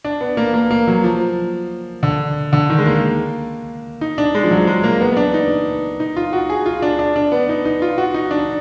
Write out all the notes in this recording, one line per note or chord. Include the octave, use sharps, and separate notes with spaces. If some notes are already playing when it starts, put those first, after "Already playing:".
D4
B3
A#3
A#3
A#3
F#3
F3
D3
D3
D#3
G#3
A#3
D#4
D4
G#3
F3
F#3
G#3
A#3
B3
B3
D4
D#4
D#4
F4
F#4
G#4
F4
D4
D4
D4
B3
D#4
D#4
F4
F#4
D#4
D4